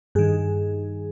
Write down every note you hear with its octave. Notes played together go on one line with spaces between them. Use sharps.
G2 D#3 G#4